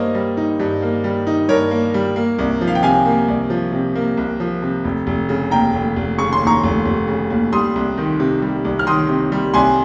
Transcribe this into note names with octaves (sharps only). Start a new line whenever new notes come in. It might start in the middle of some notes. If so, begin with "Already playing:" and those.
Already playing: G2 A#3 C5 C#5 D#5
G3
D#4
G2
A#3
G3
D#4
G2 A#4 C#5
A#3
G3
A#3
C2
F3
F5
G5
C3 F5 G#5
A#3
C2
F3
C3
A#3
C2
F3
C3
F1
F1
C#3
D#2 G5 A#5
F1
F1
C#3 C#6
C6
D#2
A#5 C#6
F1
F1
C#3
D#2
G3 C6 D#6
C2
D#3
C3
G3
C2
F6
D#3 C6 D#6
C3
G3
C2 G#5 C6